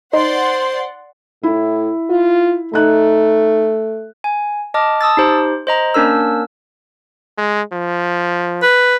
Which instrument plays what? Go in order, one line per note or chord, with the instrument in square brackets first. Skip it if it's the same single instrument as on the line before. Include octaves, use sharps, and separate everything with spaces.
[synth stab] D#4 [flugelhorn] C5 [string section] D5 F#5 C6
[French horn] A2 [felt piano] E4
[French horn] F4
[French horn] A3 [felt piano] D#4 F#6
[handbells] G#5
D#5 A5 D6 F6
A5 D#6 E6 A6
D#4 G4 C5
C5 D#5 A#5
A#3 C#4 D4 A#4 E6
[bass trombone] G#3
F3
[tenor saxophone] B4